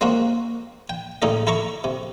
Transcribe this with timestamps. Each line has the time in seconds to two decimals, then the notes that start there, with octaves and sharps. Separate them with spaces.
0.01 G#3 A#3 C4 C#4 F#4
0.90 G5
1.22 A2 C#3 D#4 A4 D#5
1.47 E4 A4 A#5 C#6 D6
1.84 C3